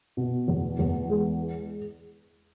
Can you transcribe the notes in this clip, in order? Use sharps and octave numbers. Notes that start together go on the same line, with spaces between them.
B2
E2
E2
G#3